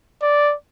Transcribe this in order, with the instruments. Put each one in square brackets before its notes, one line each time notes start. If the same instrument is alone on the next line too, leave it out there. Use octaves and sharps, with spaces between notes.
[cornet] D5